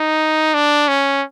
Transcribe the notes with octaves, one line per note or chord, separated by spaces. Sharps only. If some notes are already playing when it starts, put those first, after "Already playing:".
Already playing: D#4
D4
C#4